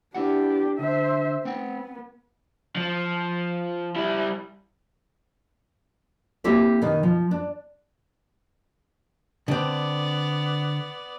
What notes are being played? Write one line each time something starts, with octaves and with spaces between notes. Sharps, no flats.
B3 D4 E4 G4 F#5
D3 C5 E5
B3 C4 F#5 G5
F3
G3 E4
A#3 C4 E4 G4 A4 E5
B2 D#3
F3
D4
D3 B3 C4 D5